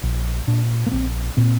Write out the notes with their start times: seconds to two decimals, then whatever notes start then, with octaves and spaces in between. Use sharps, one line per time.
0.03 A#1
0.47 A#2 D4
0.87 A#3
0.92 A#1 C4
1.37 A#2 C4